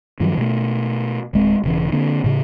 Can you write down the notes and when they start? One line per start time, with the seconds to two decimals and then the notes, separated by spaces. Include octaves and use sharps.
0.20 G2 D#3 F3 F#3
0.38 B2 A3
1.34 D1 G#3 C4
1.64 E1 C#3 E3
1.92 D3 A#3 C4 D4
2.24 A2 C#3